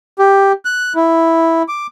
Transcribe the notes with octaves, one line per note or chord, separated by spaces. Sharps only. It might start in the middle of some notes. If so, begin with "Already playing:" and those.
G4
F#6
E4
D6